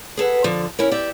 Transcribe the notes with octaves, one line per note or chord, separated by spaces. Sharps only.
G#4 A4 B4 F#5
D3 F3
C#4 E4 A#4
G4 D5 E5